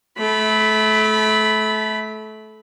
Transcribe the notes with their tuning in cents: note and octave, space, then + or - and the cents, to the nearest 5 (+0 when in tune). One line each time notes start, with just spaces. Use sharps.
A3 -25 B5 +0